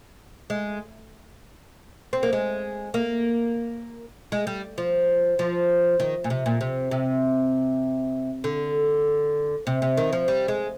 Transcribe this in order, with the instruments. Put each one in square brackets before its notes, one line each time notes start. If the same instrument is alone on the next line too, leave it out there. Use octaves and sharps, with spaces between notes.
[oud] G#3
C4
A#3
G#3
A#3
G#3
G3
F3
F3
D#3
A#2
C3
A#2
C3
C3
D3
C3
C3
D#3
F3
G3
G#3